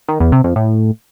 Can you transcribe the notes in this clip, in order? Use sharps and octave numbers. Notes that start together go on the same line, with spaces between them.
D#3
E2
C3
F2
A2